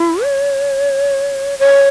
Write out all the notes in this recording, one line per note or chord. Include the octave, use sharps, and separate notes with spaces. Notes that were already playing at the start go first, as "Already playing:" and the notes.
Already playing: E4
C#5
C#5